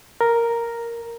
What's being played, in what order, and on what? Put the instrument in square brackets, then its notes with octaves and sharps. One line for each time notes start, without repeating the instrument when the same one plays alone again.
[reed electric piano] A#4